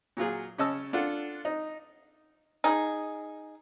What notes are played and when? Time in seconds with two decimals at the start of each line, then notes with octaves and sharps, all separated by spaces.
0.17 A#2 F#3 F4 G#4
0.58 C#3 C#4 D#5 A5 E6
0.93 D4 F4 A4 F#5
1.45 D#4
2.64 D#4 G#4